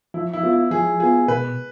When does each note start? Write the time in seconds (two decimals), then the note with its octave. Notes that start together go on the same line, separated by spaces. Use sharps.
0.14 F3 E4
0.33 E4
0.43 B3 F4
0.53 E4
0.71 F3 G#4
1.00 B3 F4 G#4
1.28 B2 B4